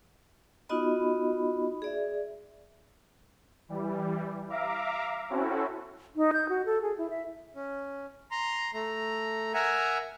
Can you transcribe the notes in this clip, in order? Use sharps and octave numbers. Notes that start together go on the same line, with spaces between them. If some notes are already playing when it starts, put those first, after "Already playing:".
B3 D#4 F4 F#4 D#5 B5
G#4 D5 E5
E3 G3
E5 F5 A#5 D6
C4 C#4 E4 F#4 A4
D#4
G6
F#4
A4
G#4
E4
E5
C#4
A#5 C6
A3 A#5
A#4 E5 F#5 G#5 A#5